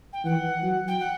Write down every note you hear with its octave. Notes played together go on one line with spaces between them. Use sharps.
G5
E3 F#5
F#3
G5
F#5